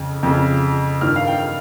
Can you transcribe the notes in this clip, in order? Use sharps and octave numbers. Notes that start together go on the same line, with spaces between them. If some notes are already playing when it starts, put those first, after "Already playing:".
Already playing: F2 C#3
F2 C#3
G2 D#3 F6
F5
G5